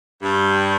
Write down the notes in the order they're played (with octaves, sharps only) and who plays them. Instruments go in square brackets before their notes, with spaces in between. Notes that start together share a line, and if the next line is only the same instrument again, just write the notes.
[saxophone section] G2